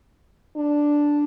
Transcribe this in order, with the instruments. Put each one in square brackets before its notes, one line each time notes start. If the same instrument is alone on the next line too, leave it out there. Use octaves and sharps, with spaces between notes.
[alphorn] D4